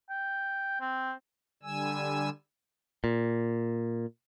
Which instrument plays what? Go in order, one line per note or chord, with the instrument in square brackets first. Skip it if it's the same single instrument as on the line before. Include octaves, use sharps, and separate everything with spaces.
[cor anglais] G5
C4
[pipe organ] D3 G3 G#5 E6
[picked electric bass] A#2